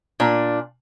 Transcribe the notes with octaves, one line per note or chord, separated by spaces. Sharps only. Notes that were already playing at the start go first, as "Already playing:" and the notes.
A#2 D4